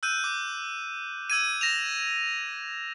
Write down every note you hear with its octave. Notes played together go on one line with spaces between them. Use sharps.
E6 F#6 G6 D#7
D6
E6 G#6 D#7
A#6 E7 F7